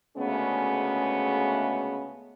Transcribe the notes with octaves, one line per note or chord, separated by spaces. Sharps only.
D2 C#3 G#3 A3 B3 C#4